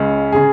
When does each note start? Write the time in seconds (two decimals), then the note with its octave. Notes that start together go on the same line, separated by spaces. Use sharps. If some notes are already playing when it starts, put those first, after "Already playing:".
Already playing: C#2 C#3
0.32 C#3 G#4